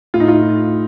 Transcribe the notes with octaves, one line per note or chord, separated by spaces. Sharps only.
A2 F4
D#4
F4